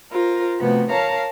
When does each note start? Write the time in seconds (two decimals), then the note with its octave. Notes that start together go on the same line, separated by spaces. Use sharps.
0.11 F4 A#4 C5
0.59 C3 F3 A3 B3 F#4
0.91 A#4 C#5 F5 A5 A#5